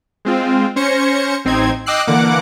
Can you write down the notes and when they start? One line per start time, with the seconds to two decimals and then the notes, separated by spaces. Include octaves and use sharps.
0.25 G#3 C4 F4
0.76 C#4 C5 G#6 A#6 C#7
1.45 A1 C4 D#4 G#6
1.86 D#5 G5 D6 E6 F#6 C7
2.07 D3 E3 A#3 F#5 D6